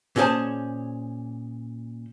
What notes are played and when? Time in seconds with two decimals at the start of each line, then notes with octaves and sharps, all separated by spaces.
0.16 A#2 C#4 F#4 G#4 C5 A5